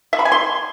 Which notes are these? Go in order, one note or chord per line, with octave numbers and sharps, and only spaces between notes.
E5
B5
G#5
C6